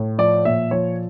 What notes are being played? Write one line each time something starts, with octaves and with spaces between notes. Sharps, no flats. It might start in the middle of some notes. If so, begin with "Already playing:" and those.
Already playing: A2
F3 D5
A#2 E5
F3 C#5